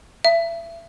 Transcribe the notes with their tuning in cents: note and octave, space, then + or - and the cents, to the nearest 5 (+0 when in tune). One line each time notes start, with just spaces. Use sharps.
E5 +30